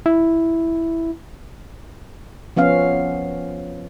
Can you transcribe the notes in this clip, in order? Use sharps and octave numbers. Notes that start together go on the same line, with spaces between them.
E4
F3 B3 C#4 F5